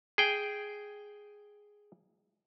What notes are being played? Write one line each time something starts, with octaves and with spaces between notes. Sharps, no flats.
G#4 G5